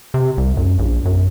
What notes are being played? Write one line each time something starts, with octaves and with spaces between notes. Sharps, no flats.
C3
C2
F#2
A#1
F#2